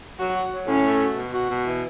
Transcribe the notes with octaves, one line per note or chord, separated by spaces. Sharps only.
F#3 F#4
F#4
F#3
A2 C#4
A3
F#4
B2
F#4
B2
E3